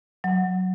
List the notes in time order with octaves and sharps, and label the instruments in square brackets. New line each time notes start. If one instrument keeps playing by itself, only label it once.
[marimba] F#3